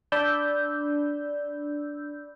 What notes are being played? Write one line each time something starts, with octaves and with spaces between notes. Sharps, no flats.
D4 D5 B5 E6 G6